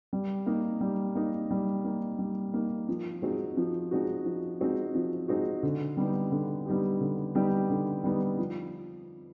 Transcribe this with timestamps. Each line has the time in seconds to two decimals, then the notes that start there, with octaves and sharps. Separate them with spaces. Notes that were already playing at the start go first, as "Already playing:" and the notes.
0.13 G3
0.46 A#3 D#4
0.81 G3
1.15 A#3 D#4
1.51 G3
1.84 A#3 D#4
2.19 G3
2.54 A#3 D#4
2.88 F3
3.22 G#3 C4 D#4 F#4
3.57 F3
3.91 G#3 C4 D#4 F#4
4.26 F3
4.61 G#3 C4 D#4 F#4
4.95 F3
5.28 G#3 C4 D#4 F#4
5.63 D3
5.97 G3 B3 D#4 G4
6.32 D3
6.66 G3 B3 D#4 G4
7.01 D3
7.35 G3 B3 D#4 G4
7.70 D3
8.04 G3 B3 D#4 G4
8.38 F3